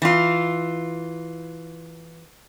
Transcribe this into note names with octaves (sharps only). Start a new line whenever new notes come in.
E3 F4